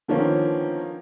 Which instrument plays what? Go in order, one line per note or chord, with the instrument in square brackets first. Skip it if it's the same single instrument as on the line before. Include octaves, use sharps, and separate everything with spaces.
[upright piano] D3 D#3 F3 A#3 B3 C#4